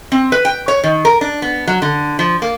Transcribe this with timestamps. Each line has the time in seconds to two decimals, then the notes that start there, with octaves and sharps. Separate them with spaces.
0.12 C4
0.32 B4
0.45 G5
0.68 C#5
0.84 D#3
1.05 A#4
1.21 D4
1.42 B3
1.67 F#3
1.82 D3
2.19 F3
2.42 A#3